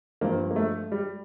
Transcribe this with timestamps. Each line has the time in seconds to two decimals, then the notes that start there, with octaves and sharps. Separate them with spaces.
0.21 G2 F3 A#3
0.51 A#3
0.56 A3
0.92 G3